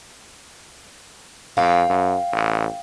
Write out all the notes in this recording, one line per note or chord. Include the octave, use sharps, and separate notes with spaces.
F2 F5 G5
F#2
A1